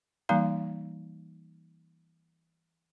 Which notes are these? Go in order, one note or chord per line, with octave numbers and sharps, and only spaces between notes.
E3 G3 A#3 D#4 F5 A#5